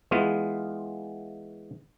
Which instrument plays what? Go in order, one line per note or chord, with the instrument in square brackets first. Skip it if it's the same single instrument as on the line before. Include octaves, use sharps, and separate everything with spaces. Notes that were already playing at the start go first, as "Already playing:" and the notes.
[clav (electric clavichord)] E3 G#3 B3 F4